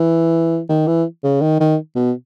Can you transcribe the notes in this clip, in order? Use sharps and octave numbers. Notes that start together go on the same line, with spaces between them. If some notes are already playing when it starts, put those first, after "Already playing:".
Already playing: E3
D#3
E3
C#3
D#3
D#3
B2